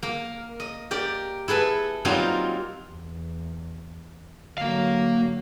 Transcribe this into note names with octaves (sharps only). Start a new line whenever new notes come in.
A#3 A#4
D#5
G4 A#4 D5
E4 G#4 A4 B4
F#3 G3 A#3 C4 D#4 F4
E2
D3 F#3 A#3 F5